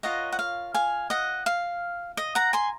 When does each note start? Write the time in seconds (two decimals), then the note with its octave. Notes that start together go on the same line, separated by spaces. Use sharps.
0.03 F4 A#4 C#5 D#5 F#5
0.32 F#5
0.39 F5
0.74 F5 G#5
1.10 D#5 F#5
1.46 F5
2.17 D#5
2.35 F#5 A#5
2.53 G#5 C6